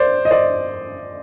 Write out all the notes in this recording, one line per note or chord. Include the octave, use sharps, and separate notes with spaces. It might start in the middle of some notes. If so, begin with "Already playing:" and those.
Already playing: C5 D5
D#5
C5 D5